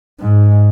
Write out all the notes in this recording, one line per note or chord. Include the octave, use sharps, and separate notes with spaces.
G#2